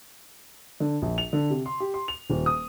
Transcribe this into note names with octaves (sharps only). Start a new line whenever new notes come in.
D3
A#1
F7
D3
C3
C6
G4
C6
F7
D#1
D#6